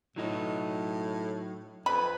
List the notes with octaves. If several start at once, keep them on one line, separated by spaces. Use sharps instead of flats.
A2 F#3 D#4 D#5
F2 B4 B5